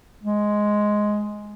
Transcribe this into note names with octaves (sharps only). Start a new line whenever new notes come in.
G#3